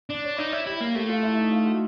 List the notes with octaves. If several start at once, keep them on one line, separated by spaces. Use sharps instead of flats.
D4 D5
C#5
D#4 D5
E4 C#5
E4 G4
A#3
A3 G4
F4
E4
D#4
F4
F#4